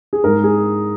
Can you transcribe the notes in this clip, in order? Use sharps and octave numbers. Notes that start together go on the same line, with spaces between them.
G#4
G#2 G#3 A#4
G#4